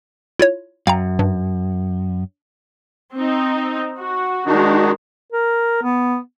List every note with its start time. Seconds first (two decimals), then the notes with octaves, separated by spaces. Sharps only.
0.39 E4 F4 C#5
0.87 F#2 F5 G5 A#5
1.19 G2
3.13 C4 D#4
3.99 F#4
4.46 D#3 G#3 D4 D#4 F#4
5.32 A#4
5.83 B3